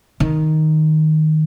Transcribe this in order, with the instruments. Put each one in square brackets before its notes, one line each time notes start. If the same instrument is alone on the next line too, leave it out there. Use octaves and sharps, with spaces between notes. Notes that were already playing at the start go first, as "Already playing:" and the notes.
[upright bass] D#3